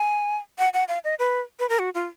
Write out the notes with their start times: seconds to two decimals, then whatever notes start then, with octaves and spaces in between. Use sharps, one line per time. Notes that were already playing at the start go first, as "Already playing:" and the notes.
Already playing: G#5
0.59 F#5
0.74 F#5
0.88 F5
1.04 D#5
1.19 B4
1.59 B4
1.69 A#4
1.79 F#4
1.95 F4